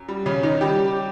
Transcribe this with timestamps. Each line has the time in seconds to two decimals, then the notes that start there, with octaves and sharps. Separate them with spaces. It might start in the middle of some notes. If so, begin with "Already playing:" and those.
Already playing: F#2
0.08 G3
0.26 C#3 C#4
0.43 D#3 D#4
0.61 G3 G4